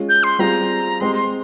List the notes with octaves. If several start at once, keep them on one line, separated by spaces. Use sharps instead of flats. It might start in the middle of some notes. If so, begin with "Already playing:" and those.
Already playing: G#3 C#4 F4 G#4
G6
C6
G3 C4 F4 G#4 A#5
G#3 C4 G4 C6
C6